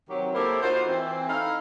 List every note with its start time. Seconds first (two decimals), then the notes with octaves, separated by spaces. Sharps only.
0.09 C3 D#3 F#3 C4 G4
0.35 A#3 E4 G4 A4 A#4 C5
0.62 D#4 F4 F#4 C5
0.88 E3 C4
1.29 D#4 E4 A4 F5